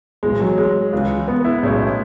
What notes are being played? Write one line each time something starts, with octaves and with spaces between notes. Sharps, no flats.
B1 A2 E3 G#3
F#3
G#3
C#2 C#3 E3
B3
E4
B1 A2 G#3 C#4